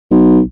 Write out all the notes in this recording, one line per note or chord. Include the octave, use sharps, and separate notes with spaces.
B1